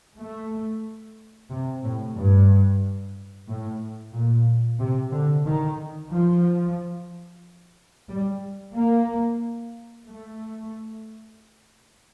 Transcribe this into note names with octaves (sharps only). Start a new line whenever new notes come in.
A3
C3
A2
G2
A2
A#2
C3
D3
D#3
F3
G3
A#3
A3